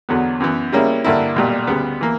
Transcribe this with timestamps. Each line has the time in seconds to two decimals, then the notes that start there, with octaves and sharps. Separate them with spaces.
0.09 E2 D3 F#3 B3
0.40 F#2 E3 B3
0.72 C#3 G3 A#3 C#4 E4
1.04 G2 D3 A#3 E4
1.36 B1 A#2 G3
1.67 D2 C#3 G3 B3
2.01 E3 A#3